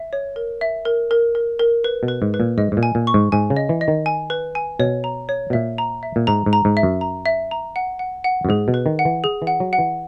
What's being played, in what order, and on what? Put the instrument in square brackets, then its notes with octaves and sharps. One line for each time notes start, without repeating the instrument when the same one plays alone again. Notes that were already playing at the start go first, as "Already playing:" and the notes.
Already playing: [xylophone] E5
C#5
A#4
E5
A#4
A#4
A#4
A#4
B4
[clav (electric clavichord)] B2
[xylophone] B4
[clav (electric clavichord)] G#2
[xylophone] B4
[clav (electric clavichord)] A#2
[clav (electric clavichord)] G#2 [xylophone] D#5
[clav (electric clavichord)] G#2
A#2
[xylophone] G#5
[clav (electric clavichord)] A#2
[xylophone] C#6
[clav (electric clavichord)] G#2
[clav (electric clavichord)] G#2 [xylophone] G#5
[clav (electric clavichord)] C#3
[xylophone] D#5
[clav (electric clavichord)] E3
[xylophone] D#5
[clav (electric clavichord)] D#3
[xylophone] G#5
B4
G#5
[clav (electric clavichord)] B2 [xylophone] C#5
[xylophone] A#5
C#5
[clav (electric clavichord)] B2
[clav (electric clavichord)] A#2 [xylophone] E5
[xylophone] A#5
E5
[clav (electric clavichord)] A#2
[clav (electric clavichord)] G#2 [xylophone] A#5
[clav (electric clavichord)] G#2
[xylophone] A#5
[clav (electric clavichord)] G#2
[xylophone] E5
[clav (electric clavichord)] F#2
[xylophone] A#5
E5
A#5
F#5
F#5
F#5
[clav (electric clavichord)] F#2
[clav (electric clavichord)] G#2 [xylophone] G#4
[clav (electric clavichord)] B2
[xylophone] B4
[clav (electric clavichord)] D#3
[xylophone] F#5
[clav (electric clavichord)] E3
[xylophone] G#4
[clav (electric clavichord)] E3
[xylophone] F#5
[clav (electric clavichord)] F#3
[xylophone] F#5
[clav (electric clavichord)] E3